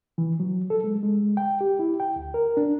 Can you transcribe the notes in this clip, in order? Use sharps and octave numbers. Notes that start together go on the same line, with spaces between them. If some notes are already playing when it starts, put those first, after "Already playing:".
E3
F#3
A4
G#3
G#3
G5
G4
E4
G5
D2
A#4
D4